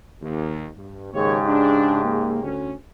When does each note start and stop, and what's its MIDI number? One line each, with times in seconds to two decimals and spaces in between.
0.22 0.68 39
0.77 1.10 43
1.13 1.38 39
1.13 2.48 44
1.13 2.48 49
1.13 2.48 67
1.13 1.38 73
1.46 2.00 62
2.03 2.39 58
2.42 2.73 38
2.42 2.73 61